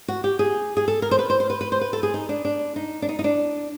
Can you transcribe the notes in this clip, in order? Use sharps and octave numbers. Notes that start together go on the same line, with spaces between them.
F#4
G4
G#4
G#4
A4
A#4
C5
B4
C5
C5
B4
B4
C5
B4
A4
G#4
D#4
D4
D4
D#4
D4
D#4
D#4
D4